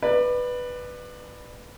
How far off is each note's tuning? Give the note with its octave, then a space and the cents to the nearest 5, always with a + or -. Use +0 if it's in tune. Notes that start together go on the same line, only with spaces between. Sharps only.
B4 +0 D5 +30